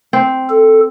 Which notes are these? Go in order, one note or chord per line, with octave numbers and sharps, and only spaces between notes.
C4
A4